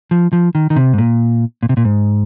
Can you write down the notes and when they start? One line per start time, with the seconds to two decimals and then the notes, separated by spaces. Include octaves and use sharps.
0.11 F3
0.33 F3
0.55 D#3
0.70 D#3
0.76 C3
0.93 G#2
0.98 A#2
1.63 A#2
1.69 C3
1.77 A#2
1.85 G#2